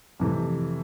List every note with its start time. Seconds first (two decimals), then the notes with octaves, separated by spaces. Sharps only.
0.20 F2 C3 E3 A3